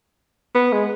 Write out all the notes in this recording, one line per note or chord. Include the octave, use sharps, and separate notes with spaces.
B3
G#3